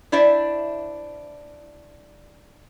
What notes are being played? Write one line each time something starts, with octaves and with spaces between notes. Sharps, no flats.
D4 E4 C5 D5 E5